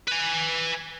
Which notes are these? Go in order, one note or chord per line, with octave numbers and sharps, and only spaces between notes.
B4 G#5